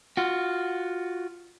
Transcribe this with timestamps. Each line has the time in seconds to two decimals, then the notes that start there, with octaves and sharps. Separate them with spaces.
0.17 F4 F#4